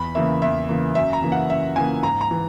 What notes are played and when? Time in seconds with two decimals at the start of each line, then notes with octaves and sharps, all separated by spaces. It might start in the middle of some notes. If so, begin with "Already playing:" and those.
Already playing: E2 B5
0.15 C#3 E3 A#3 E5
0.42 E2 E5
0.69 C#3 E3 A#3
0.95 F#2 E5
1.13 A#5
1.22 C#3 E3 A#3
1.32 F#5
1.50 F#2 E5
1.76 C#3 E3 A#3 G#5
2.03 G#2 A#5
2.21 A#5
2.31 E3